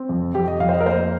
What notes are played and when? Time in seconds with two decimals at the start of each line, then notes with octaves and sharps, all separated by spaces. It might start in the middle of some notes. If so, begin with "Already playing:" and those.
Already playing: C4
0.09 F2
0.34 F2 G4
0.48 D#5
0.60 F2 F5
0.69 C5
0.73 D#5
0.81 A#4
0.86 A#3 C5